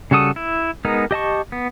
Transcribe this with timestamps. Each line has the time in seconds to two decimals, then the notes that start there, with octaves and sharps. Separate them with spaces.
0.11 C#3 G3 F#4 A4 D#6
0.36 E4
0.85 G#3 B3 D#4 A#4
1.11 G4 D#5 A5 C#6
1.52 B3